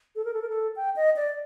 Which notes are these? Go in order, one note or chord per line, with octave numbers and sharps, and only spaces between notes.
A4
A#4
A4
A#4
A4
G5
D#5
D5